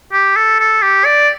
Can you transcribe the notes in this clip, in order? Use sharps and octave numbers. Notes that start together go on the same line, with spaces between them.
G4
A4
A4
G4
D5